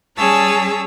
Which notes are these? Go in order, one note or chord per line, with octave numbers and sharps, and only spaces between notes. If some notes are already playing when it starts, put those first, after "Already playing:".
G3 C#4 G#4 C#5 A5 E6